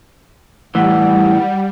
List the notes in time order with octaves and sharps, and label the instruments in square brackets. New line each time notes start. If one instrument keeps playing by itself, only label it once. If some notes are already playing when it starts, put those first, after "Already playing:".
[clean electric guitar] A2 E3 [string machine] G3 [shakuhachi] F#5